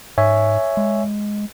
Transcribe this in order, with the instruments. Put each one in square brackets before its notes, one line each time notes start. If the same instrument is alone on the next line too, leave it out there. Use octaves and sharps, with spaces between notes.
[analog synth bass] G#2 [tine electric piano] C#5 E5 G#5
[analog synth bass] G#3